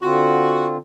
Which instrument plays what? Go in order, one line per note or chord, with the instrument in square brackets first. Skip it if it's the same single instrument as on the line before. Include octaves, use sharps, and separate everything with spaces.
[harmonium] D3 C4 F4 [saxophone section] F#4